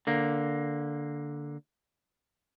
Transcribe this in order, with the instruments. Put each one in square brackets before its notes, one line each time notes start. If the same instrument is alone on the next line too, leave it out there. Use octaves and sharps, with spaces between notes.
[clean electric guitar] D3 A#3